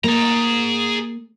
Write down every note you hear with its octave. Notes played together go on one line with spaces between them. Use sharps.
A#3 G#4 A#5